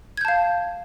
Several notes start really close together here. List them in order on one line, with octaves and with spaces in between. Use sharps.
G#6 G6 A5 F5